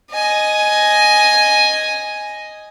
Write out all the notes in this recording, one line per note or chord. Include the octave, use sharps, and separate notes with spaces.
D#5 G#5